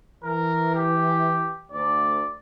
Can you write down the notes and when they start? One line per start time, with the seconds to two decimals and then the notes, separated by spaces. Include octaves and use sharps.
0.24 E3 A#4
0.75 G4
1.72 D2 D5